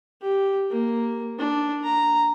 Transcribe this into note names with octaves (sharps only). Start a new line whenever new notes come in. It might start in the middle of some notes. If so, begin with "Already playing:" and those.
G4
A#3
D4
A#5